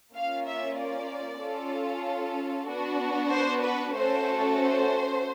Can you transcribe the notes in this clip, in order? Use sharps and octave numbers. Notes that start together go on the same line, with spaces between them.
A#3 C#4 F4 F5
E5
D5
C#4 F4 A4
B3 D4 F#4
C5
B4
A3 C#4 F#4 A4 C5
C5